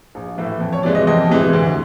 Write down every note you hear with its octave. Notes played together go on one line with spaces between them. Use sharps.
A#1
A2 E3
F2
C#5
C3 E3 G#3 D5
D#5
F2 D#5
C3 E3 G#3
D2